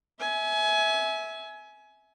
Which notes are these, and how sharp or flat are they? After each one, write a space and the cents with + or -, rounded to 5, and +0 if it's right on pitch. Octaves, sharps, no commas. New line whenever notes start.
E5 -15 G#5 +25